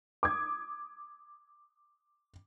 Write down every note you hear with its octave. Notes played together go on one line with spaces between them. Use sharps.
D6 D#6 G#6